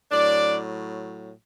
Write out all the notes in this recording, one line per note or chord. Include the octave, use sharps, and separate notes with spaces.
A2 F#3 D4 D5